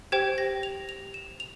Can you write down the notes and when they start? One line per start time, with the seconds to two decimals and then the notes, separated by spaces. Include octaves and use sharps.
0.12 G4 C5 G5 G#6
0.38 A#6
0.63 F7
0.89 F7
1.14 E7
1.40 F7